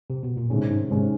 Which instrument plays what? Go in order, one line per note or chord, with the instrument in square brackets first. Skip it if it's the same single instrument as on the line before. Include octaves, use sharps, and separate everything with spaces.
[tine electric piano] C3
B2
A#2
[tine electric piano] A2 [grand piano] C3 D#3 G#3 C#4
[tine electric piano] G#2
[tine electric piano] G#2 [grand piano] C3 D#3 G#3 C#4